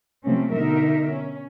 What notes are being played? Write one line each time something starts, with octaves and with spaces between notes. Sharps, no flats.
C3 F3 A3 A#3 C4 C#4
B2 D3 D#4 A#4 E5
C#4